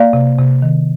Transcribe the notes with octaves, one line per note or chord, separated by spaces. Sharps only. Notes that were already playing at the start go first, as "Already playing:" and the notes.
Already playing: A#3 D5 F5
C3
C3
D#3